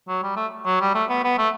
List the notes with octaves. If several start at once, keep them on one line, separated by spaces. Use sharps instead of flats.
F#3
G3
A3
F#3
G3
A3
B3
B3
A3